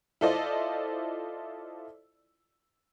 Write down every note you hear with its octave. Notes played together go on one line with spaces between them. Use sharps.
E4 F4 A4 C5 D5 D#5